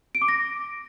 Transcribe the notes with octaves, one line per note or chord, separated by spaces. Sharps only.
D7
D6
A#6